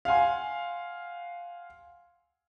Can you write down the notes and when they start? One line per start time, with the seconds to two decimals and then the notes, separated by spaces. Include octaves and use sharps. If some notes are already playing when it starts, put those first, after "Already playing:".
0.05 F5 F#5 G#5 C6